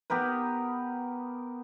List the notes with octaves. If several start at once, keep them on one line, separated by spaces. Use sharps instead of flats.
B3 G4 A#4 B4